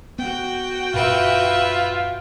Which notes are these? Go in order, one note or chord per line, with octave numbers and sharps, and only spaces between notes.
B3 F#4 F#5 G5
F#2 A#2 F4 B4 E5